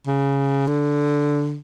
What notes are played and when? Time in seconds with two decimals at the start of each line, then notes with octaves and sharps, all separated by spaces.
0.07 C#3
0.67 D3